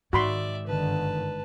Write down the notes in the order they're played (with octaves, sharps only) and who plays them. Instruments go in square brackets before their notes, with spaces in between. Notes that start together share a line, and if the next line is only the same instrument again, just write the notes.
[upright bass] G#2 [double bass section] D#3 [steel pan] F#4 B5 C6 [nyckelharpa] D5 E5
[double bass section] G1 D3 D#3 [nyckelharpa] B4 A5